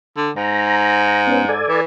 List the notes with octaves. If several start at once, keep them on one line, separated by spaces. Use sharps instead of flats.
D3
G#2 A#5
B3 C#4
A4 D5 G#5
E3